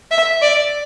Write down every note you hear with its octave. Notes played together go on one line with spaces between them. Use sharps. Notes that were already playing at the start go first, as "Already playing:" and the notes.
E5
D5